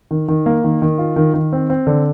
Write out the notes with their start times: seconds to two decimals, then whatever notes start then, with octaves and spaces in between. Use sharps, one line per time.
0.11 D#3
0.28 D#3
0.46 A#3
0.64 D#3
0.82 D#3
0.98 F4
1.16 D#3
1.34 D#3
1.53 C4
1.70 C4
1.87 D3